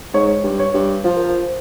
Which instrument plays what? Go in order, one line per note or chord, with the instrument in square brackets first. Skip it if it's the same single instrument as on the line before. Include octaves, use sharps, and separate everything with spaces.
[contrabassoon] G#2 [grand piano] C#5
[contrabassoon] G2
[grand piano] C#5
[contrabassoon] G2
[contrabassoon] F3 [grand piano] C5
[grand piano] A#4
C5